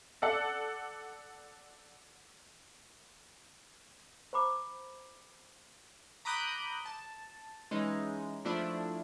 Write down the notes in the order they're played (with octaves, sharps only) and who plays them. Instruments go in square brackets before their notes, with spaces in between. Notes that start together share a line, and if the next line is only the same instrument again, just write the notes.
[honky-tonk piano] A4 D5 F#5
[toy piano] C5 A#5 B5 D6
[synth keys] A#5 B5 D6 D#6 F#6 G6
A5
E3 G#3 C#4 D#4
F3 A3 D4 E4